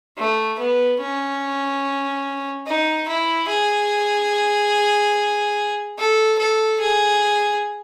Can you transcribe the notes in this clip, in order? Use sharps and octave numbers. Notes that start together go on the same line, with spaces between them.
A3
B3
C#4
D#4
E4
G#4
A4
A4
G#4